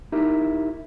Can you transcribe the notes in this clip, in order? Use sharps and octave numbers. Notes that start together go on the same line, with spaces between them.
D#4 E4 G4 A#4